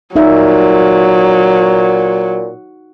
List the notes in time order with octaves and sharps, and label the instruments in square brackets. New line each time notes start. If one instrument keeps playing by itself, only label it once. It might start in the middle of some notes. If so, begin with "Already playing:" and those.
[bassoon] A#2 [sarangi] F#3 [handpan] D#4 A#4 E5